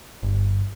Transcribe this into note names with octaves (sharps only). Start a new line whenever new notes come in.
G1